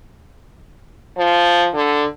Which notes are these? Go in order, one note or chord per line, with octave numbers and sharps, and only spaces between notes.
F3
D3